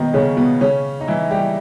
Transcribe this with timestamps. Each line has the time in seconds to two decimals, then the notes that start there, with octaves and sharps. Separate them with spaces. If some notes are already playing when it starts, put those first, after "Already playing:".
Already playing: B2 D#3 B3 D#4
0.13 C#3 C#4
0.37 B2 B3
0.61 C#3 C#4
1.01 D#4
1.08 E3 E4
1.31 G3 G4